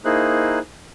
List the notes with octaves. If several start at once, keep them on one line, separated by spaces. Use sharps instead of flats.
A#3 D#4 E4 G#4 C5 F#6